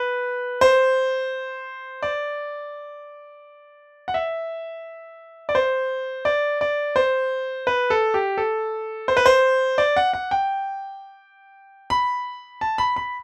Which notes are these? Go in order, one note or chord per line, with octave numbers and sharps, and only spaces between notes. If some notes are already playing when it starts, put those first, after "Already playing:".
Already playing: B4
C5
D5
F#5
E5
D5
C5
D5
D5
C5
B4
A4
G4
A4
C5
B4
C5
D5
F#5
F#5
G5
B5
A5
B5
B5